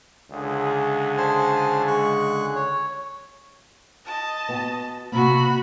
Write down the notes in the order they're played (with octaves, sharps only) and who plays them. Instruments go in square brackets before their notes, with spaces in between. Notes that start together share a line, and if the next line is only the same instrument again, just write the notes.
[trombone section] C#2 D3 G#4
[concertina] C5 G#5 A5
G#3 C#6 F#6
C#5
[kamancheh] D#5 A5
[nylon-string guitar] B3 F#4 G#5
[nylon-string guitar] C3 A#3 [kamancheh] F#4 B5